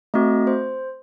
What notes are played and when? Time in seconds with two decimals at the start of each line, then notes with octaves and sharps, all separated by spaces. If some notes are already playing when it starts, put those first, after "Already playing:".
0.14 A3 C4 F#4 D#5
0.47 C5